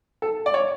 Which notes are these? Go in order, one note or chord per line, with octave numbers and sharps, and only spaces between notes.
A4
D5
C#5